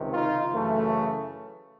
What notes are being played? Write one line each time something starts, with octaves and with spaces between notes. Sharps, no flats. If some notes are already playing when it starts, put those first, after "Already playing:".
Already playing: C#2 C3 D#3
D#4 F4
F#2 C#3 E3 A3